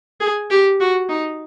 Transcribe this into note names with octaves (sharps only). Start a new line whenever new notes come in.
G#4
G4
F#4
D#4